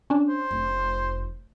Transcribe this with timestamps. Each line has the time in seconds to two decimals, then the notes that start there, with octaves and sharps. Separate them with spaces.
0.10 C#4 D4
0.29 C5
0.51 F1